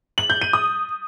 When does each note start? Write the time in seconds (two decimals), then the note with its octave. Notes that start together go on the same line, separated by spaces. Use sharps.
0.18 F#7
0.30 G6
0.42 D#7
0.53 D#6